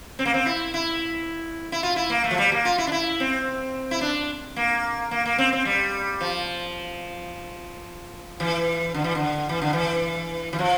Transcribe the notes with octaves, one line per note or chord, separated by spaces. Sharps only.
C4
A#3
C4
E4
E4
E4
F4
E4
A#3
A3
F3
G3
A#3
F4
E4
D4
E4
C4
E4
D4
A#3
A#3
A#3
C4
C4
G3
F3
E3
D3
E3
D3
E3
D3
E3
E3
F3